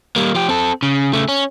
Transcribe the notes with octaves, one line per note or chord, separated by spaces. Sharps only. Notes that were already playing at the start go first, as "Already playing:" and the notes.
G3 A#3
F3 G4
C4 A4
C#3
C#3 A3
C#4